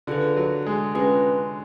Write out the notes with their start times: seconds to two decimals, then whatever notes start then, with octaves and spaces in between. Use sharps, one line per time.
0.07 D3 F4 G#4 B4
0.36 F#3
0.67 G#3
0.95 G#3 C#4 F4 B4